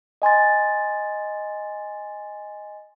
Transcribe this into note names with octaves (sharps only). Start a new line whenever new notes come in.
D#5 G#5 C6 A6